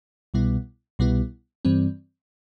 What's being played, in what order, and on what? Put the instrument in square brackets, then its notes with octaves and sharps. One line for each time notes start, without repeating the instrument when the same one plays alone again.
[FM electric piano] C2 B2 G3 B3 E4
C2 B2 G3 B3 E4
G2 E3 G3 C4